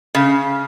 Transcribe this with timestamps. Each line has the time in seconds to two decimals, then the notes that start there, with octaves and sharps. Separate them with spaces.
0.15 C#3